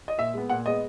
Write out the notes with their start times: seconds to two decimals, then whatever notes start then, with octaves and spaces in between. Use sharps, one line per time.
0.08 D#5
0.18 A#2 E5
0.34 G#3 B3
0.50 A#2 F#5
0.66 G#3 B3 D#5